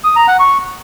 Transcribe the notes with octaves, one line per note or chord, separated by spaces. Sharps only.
D#6
A#5
F#5
C#6